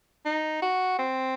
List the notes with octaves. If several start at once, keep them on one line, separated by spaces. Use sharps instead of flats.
D#4
F#4
C4